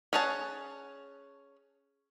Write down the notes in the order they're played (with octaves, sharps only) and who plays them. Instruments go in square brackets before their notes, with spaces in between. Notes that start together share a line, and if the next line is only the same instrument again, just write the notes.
[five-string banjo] C#4 G#4 C#5 F#5 A5